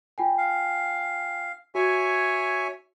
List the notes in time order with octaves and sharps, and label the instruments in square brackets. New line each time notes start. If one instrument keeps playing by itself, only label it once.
[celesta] F4 G5 G#5
[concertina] F5
[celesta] F#4 [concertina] C#5 E5 G#5